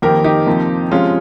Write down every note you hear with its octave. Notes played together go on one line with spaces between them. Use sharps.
F2 D#3 A#3 G4 A#4
D#4 G4
F2 C3 F3 A#3
C3 F3 G#3 C#4 F4